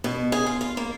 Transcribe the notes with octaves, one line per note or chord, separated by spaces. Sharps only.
B2
G#4
F4
F4
A#3